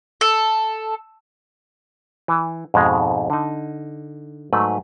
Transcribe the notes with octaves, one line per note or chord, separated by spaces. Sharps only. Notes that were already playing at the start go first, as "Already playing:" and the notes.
A4
E3
F2 G#2 B2 G#3
D3 D#4
G#2 F#3 A3 B4